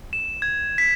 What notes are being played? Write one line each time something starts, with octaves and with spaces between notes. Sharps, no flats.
E7
G#6
B6